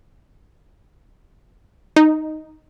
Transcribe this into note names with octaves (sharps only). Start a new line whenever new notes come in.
D#4